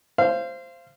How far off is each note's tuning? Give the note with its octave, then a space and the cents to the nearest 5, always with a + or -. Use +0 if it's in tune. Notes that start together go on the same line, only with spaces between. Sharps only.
C5 +0 F5 -30